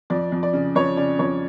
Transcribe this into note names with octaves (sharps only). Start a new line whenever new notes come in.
F2 D5
F2
D5
C#3
F2 C#5
C#3 D5
F2 C#5